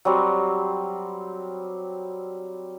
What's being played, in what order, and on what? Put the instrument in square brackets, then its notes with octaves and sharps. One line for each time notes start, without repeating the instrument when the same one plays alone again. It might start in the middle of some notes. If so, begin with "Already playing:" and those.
[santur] F#3 G3 C4